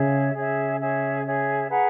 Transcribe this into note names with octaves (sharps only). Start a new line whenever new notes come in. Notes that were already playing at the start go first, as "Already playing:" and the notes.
Already playing: C#3 G#4 C#5 E5
C#3 G#4 C#5 E5
G#4 C#5 E5
G#4 C#5 E5
G#4 B4 F#5 A#5